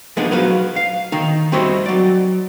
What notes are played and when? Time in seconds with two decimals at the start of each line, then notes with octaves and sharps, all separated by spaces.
0.17 F3 G#3 B3 D4 D#4 G#4
0.31 F#3 B4 F5
0.76 F5
1.12 D#3 D#4
1.52 G3 C4 F#4 D#5 E5
1.86 F#3 D5